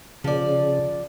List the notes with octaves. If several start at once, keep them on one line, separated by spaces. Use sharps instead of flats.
C#3 F3 D5